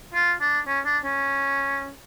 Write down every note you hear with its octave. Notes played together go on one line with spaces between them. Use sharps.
F4
D4
C#4
D4
C#4